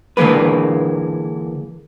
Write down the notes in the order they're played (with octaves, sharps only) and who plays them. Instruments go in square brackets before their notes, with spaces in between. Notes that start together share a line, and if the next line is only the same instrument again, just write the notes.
[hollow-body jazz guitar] D3 E3 G#3 A#3 B4